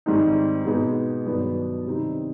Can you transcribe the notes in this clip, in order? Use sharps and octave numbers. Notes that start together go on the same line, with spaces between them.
G#2 D#3 G3 C4 D#4
B2 G#3 B3 D#4 G#4
G2 D#3 F#3 B3 D4
C3 D#3 G3 C4 D#4